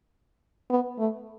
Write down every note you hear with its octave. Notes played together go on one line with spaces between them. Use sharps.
B3
A3